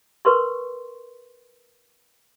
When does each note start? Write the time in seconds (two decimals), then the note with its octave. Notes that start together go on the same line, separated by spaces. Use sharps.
0.25 A#4 B4 C6 C#6